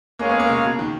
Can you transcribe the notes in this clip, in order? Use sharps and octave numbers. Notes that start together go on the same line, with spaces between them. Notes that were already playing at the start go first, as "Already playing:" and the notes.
G#3 A#3 C#4 G#4 C#5 F5
B3
A#3
C#3
B2
D#3